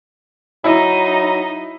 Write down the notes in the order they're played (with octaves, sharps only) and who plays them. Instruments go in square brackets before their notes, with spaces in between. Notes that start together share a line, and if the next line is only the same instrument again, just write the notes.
[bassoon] F#3 [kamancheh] D#4 D#5 [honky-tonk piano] E4